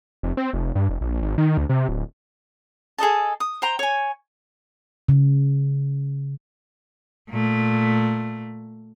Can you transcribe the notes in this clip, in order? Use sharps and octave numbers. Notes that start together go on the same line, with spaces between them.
F1
C4
F1
G2
F1
A#1
G#1
D#3
D2
C3
D1
G#4 A4 D#5 A5
D#6
C5 G5 A#5
C#5 G#5
C#3
A#2 A3